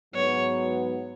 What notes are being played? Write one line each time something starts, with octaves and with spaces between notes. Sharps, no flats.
G#2 F#3 B3 C#5